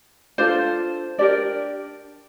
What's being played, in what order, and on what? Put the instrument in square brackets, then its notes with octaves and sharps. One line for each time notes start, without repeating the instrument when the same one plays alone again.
[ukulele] D4 F4 A4 C5
D4 G4 A#4 D5